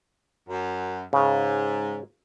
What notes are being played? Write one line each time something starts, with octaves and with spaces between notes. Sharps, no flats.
F#2
G#2 C#3